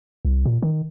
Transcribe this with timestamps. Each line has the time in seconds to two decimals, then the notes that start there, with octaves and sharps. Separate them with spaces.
0.25 C2
0.45 A#2
0.62 D#3